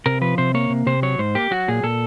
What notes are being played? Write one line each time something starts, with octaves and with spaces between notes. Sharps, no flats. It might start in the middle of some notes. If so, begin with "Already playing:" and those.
C3 A#4
F3 B4
C3 C5
A#3 C#5
C3
C3 C5
F#3 C#5
G#2 C5
A#3 G4
F#3 F#4
A#2 G#4
A#2 A4